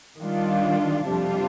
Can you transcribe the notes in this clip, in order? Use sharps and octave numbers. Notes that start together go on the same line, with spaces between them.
D#3 G3 D4 F4
F2 C3 G3 D4 F4